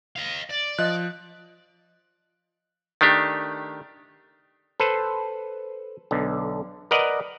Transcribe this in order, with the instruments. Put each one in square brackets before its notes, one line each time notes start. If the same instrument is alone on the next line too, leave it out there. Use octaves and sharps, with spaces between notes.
[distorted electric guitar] D#5 F5
D5
[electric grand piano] F3 [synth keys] D#5 [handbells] F#6
[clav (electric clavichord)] D#3 A3 D4 G4
A4 B4 C5
B1 D3
A#4 B4 D5 D#5 F#5